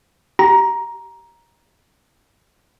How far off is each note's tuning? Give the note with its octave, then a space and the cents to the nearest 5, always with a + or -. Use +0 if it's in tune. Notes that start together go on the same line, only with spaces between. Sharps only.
G4 -20 A#5 +10